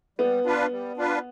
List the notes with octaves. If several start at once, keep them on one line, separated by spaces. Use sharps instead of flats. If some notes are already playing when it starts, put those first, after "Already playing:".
G3 B3
D4 F4 B4
G3
D4 F4 B4